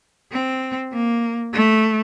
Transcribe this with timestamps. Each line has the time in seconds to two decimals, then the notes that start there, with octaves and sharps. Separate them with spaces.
0.32 C4
0.92 A#3
1.54 A3